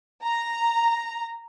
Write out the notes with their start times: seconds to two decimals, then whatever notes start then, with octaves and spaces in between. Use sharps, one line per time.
0.23 A#5